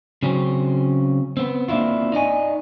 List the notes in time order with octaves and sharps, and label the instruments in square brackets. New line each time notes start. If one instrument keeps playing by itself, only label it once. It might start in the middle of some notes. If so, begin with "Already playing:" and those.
[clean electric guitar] C#3 F#3 C4 C#4
B3 C4
A#3 C4 D4 E4 F4
D#4 D5 D#5 G#5